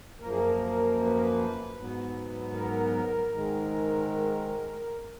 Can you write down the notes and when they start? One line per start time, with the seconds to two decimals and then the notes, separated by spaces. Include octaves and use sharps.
0.20 F#2 F3 A#3 A#4
0.30 G#4
0.37 A#4
1.06 B4
1.14 A#4
1.21 B4
1.77 G#2 F#3 B3
2.53 A#4
3.31 G#2 D#3 G#3